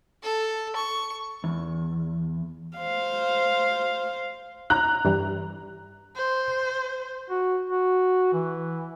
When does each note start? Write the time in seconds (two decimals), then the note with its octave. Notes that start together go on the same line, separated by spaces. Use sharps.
0.23 A4
0.76 C#6
1.44 E2
2.78 C5 F5
4.70 A#5 F#6
5.05 G2 E3 G3
6.16 C5
7.30 F#4
7.70 F#4
8.33 E3